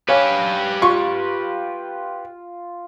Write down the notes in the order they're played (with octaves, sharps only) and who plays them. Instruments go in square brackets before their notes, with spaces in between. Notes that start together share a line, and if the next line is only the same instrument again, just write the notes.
[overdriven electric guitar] G4 B4 [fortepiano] C#5 [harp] F5 G#5 D6
[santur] F4 [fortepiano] C#6